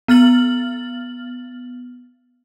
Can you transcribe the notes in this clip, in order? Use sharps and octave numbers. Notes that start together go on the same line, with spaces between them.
B3 F6 A6 F#7